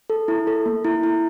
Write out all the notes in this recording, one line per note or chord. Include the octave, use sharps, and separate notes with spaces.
A4
E4
A4
A#3
E4
E4